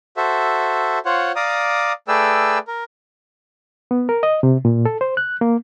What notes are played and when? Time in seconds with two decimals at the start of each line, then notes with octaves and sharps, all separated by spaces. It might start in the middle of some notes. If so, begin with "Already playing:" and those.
0.17 F#4 A4 C5 E5
1.05 F4 C5 C#5 F#5
1.36 D5 F5 A#5 D6 D#6
2.08 A3 G#4 B4 D5 G5 E6
2.68 A#4
3.91 B3
4.09 A#4
4.23 D#5
4.43 C3
4.65 A#2
4.85 A4
5.01 C5
5.17 F#6
5.41 A#3